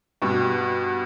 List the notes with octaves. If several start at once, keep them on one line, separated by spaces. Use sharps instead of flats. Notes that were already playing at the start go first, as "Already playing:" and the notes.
G2 B2